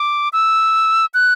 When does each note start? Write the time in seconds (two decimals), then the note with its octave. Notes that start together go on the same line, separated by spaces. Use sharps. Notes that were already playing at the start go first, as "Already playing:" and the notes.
Already playing: D6
0.33 E6
1.14 F#6